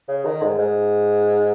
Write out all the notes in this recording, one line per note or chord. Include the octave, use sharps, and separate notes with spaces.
C#3
D#3
G#2
G#2